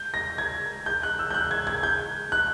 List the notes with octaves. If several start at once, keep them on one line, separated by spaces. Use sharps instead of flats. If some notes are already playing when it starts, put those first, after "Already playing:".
Already playing: G6
A#6
G#6
G6
F#6
E6
G6
F#6
G#6
G#6
G6
F#6